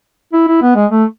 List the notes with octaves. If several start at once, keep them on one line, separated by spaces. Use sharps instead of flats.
E4
E4
B3
G#3
A3